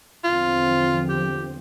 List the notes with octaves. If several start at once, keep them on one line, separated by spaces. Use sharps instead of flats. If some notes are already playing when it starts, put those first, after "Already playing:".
E2 D3 F3 C4 F4
G4